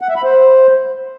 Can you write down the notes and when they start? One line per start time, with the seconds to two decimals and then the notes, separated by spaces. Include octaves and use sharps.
0.01 F#5
0.09 E5
0.16 B5
0.23 C5